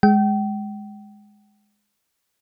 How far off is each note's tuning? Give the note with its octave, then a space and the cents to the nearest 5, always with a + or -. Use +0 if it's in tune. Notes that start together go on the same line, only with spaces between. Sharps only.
G#3 +0 G5 -35